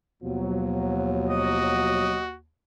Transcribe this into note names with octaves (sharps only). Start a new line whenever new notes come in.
D#2 B2 F3 F#3
F#4 D#5